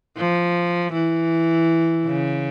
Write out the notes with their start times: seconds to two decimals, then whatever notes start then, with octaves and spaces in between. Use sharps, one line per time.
0.18 F3
0.93 E3
2.06 C#3